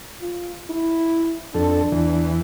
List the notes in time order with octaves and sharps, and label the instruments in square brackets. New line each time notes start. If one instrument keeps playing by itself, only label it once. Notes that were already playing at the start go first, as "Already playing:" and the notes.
[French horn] F4
E4
[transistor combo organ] F2 A4 [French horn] D4
[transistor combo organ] E2 E3